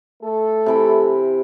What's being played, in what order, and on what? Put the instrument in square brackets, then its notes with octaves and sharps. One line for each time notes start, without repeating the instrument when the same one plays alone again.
[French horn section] A3 A4
[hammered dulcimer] C3 E3 B5